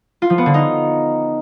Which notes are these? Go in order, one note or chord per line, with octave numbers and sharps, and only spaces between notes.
F4
F3
B3
D3
D#4